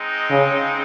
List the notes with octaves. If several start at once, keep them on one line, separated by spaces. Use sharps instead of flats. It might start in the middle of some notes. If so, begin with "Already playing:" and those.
Already playing: G#3 C4 D#4
C#3